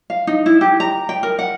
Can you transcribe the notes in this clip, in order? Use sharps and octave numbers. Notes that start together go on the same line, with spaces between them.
F5
D#4
E4
G4
A#5
G5
A#4
F#5